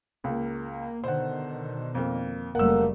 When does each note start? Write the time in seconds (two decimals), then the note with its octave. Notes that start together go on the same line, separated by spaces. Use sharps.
0.24 C#2 A#3
1.04 B2 D3 D#3 C5 F#5
1.95 F2 A#3
2.55 F#1 G3 A3 A#3 F#5 E6